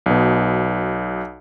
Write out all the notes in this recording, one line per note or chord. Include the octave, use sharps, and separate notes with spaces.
B1 B2